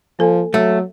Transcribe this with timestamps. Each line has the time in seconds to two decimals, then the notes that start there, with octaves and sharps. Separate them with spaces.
0.19 F3 A#3 A4 G#5
0.54 F#3 A3